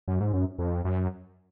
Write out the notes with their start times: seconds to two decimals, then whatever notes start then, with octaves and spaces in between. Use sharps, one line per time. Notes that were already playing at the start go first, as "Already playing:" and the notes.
0.08 F#2
0.20 G#2
0.33 F#2
0.59 F2
0.84 F#2